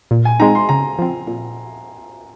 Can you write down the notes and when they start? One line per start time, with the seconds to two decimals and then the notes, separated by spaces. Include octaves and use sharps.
0.11 A#2
0.25 G#5
0.40 G#3 C4 D#4 A#5
0.55 C6
0.69 C#3 A#5
0.99 F3 C4
1.27 A#2